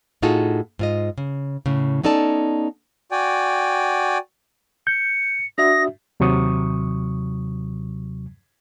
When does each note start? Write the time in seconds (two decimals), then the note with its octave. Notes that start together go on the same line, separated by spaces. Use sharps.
0.22 A2 D#4 F4 F#4 G#4 A4
0.79 G#2 F4 D#5
1.18 C#3
1.66 A2 C#3
2.03 B3 C#4 D#4 A4 D5 A5
3.12 F#4 D5 G5 G#5
4.87 G6 C#7
5.58 D4 F#4 E5 D#6 A#6
6.20 D#2 C3 F#3 C#6 D#6